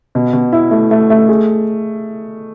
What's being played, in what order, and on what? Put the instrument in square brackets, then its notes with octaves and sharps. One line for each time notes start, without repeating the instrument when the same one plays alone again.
[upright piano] B2
B2
E4
A3
A3
A3
G#4